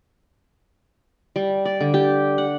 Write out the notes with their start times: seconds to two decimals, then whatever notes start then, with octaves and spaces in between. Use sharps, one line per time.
1.36 G3
1.65 D5
1.81 D3
1.94 G4
2.38 F#5